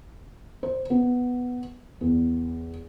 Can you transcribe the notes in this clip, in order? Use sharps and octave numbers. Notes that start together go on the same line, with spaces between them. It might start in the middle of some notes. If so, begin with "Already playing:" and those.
C5
B3
E2